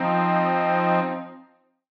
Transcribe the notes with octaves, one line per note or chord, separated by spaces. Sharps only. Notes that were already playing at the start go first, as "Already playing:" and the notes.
Already playing: F3 C4 D#4